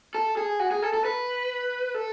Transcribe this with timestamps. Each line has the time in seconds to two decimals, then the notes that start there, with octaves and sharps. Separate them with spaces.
0.15 A4
0.37 G#4
0.60 F#4
0.71 G#4
0.82 A4
0.93 A4
1.05 B4
1.95 A4